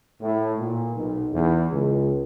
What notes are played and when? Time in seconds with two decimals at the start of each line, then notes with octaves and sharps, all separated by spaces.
0.21 A2
0.57 A#2
0.94 B1
1.32 E2
1.71 C#2